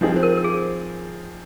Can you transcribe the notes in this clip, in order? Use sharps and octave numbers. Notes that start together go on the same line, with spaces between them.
F3 C4 D#4 G#4
C5
A#4
A#4
G#4